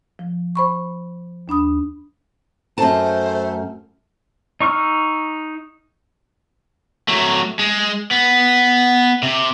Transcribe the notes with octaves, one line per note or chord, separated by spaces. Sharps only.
F3
C5 B5 C#6
D#2 D4 B5 D#6
F#2 A3 C5 A5
D#4 C#6 E6 F6
F#3 A3
G#3
B3
C3